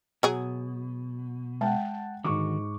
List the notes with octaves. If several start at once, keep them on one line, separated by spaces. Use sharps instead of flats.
B2 F#3 G#4 G#5
G#3 F#5 G5 A5
G#2 D3 D#3 F#4 C#6 D6